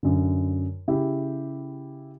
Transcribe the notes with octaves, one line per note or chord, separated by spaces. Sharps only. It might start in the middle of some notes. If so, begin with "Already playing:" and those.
F#2 D3
C#3 E4 G4